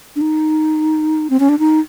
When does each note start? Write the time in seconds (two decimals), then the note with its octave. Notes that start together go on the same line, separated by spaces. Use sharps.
0.16 D4
0.21 D#4
1.30 C4
1.40 C#4
1.49 D4
1.59 D#4